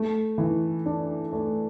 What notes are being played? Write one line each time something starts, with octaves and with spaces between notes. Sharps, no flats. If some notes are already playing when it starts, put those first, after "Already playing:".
Already playing: A3
E3
D4
A3